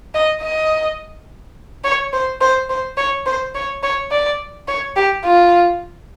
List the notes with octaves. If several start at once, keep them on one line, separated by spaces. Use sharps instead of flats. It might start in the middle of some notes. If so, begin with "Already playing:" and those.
D#5
D#5
C#5
C5
C5
C5
C#5
C5
C#5
C#5
D5
C#5
G4
F4